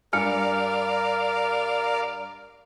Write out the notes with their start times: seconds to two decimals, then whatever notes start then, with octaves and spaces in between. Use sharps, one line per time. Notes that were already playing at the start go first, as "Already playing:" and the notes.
0.13 G2 A#4 D5 F5 G#5 F6 C#7